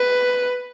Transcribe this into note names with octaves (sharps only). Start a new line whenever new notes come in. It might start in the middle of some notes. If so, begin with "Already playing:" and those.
Already playing: B4